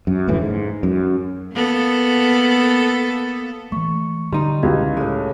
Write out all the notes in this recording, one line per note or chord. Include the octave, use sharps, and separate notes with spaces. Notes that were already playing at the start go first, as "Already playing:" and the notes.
F#2
F1 D2 A2 E3
G#2
F#2
A#3 B3 A4
E3 A3 C#6
D3 G3 D#4 C6
C#2 E4 G4 G#6
A2 G#3 A4 C#5